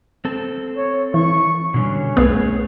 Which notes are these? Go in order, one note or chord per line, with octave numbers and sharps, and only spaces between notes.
C4 A4
C#5
E3 C#6
B2 D3 G3 C#4
B1 A3 B3 G#4 C#5